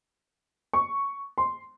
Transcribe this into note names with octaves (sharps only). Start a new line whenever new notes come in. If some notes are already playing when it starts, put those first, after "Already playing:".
C#6
C6